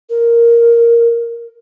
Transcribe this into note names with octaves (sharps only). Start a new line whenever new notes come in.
A#4